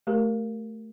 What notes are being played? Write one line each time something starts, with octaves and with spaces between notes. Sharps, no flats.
A3 G4 A#4